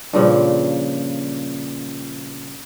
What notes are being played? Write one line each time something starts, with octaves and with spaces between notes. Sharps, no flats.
G2 A#2 C#3 F3